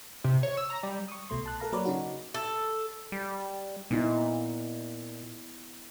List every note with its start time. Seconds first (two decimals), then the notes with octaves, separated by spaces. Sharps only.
0.24 C3
0.43 C#5
0.57 E6
0.70 A#5
0.83 G3
1.08 C#6 D#6
1.30 C2 B2 A3 C6
1.46 A5 F#6
1.60 A4 A#4 F5 A#5
1.72 F#3 A#3 A#4 B4 C#5 D5
1.85 C#3 D#4 F#4
2.34 A4
3.12 G3
3.91 A#2 B3 D#4 E4